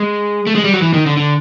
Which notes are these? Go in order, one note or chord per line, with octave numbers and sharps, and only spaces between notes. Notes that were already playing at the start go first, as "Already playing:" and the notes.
Already playing: G#3
A3
G#3
G3
F#3
E3
D#3
D3
D3